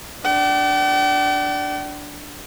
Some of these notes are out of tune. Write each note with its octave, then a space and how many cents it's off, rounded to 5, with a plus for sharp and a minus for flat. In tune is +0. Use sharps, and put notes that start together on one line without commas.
D4 +0 G5 -45